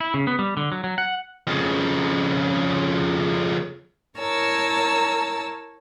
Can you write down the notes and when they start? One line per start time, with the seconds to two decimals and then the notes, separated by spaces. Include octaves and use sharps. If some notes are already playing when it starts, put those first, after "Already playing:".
0.01 E4
0.14 C#3
0.27 B3
0.39 G3
0.57 D3
0.72 F#3
0.84 F#3
0.98 F#5
1.47 F2 C#3
4.17 E4 A#4 C#5 A5 E6